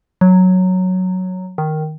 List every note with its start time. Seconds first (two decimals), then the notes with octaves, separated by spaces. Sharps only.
0.21 F#3
1.58 D#3